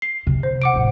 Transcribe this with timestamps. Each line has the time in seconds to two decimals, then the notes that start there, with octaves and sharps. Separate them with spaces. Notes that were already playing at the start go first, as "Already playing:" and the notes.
0.02 C7
0.27 C3 D#3
0.43 C5
0.62 F#5 D6 D7
0.73 D1 A2